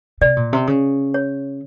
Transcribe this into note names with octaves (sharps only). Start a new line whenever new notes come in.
C3 D5
A#2
C3
C#3
C#5